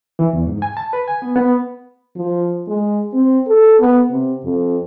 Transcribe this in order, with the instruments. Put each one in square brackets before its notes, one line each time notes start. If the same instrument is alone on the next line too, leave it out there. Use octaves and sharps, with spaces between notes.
[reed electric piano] E3
E2
G#2
G#5
A5
B4
G#5
B3
B3
[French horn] F3
G#3
C4
A4
B3
C3
F2